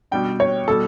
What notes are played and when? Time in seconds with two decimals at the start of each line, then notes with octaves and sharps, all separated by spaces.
0.11 B2 G3 D4 G5
0.40 C#5
0.68 B2 G3 A4